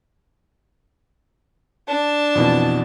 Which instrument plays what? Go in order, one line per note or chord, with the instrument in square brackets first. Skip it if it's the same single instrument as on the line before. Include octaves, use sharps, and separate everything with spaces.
[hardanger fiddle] D4 A5
[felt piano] F2 B2 E3